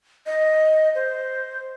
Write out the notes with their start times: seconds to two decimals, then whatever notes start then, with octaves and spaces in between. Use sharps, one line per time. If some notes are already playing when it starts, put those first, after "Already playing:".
0.26 D#5
0.95 C5